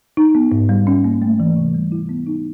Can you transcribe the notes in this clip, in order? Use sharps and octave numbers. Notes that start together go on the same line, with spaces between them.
D#4
B3
G#2
G3
C#4
A#3
A3
E3
C3
G3
E4
B3
D#4